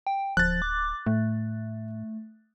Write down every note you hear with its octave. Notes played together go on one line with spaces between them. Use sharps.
G5
D1 F3 F#6 A6
D6
A2 A3